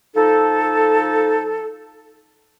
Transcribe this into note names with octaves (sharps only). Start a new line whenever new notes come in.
F3 D#4 A4